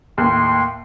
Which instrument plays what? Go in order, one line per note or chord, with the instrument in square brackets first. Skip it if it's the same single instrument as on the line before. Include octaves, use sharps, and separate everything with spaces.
[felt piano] D#2 A2 [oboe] C6